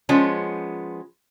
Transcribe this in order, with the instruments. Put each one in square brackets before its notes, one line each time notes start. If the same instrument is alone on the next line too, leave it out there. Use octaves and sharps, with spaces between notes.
[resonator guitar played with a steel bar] F3 G#3 B3 C#4